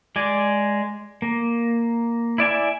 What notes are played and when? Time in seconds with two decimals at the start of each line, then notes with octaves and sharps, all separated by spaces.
0.16 G#3 D5 G#5
1.22 A#3
2.38 E4 D5 E5 G#5